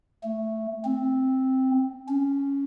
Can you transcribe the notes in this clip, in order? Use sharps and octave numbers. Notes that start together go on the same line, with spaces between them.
A3
C4
C#4